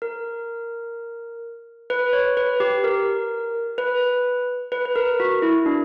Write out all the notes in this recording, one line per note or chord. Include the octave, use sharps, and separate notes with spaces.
A#4
B4
C#5
B4
G4
A#4
B4
B4
B4
A#4
F#4
E4
D4